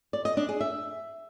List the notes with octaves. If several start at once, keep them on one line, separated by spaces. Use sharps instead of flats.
D5
D#5
D4
G#4
E5